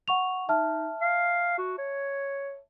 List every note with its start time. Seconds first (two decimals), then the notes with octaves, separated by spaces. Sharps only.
0.08 F#5 C#6 F7
0.49 D#4 E5 A5 F6
1.01 F5
1.58 F#4
1.78 C#5